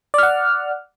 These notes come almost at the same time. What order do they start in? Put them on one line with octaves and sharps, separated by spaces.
D5 F6 F#5